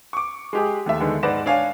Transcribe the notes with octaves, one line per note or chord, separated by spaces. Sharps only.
C#6 D6
G#3 G4 G#4
D#2 A3 E5
D3 D#3 G#3 B3 A4
G#2 B4 D5 F#5 A#6 E7
D4 C#5 F5 G#5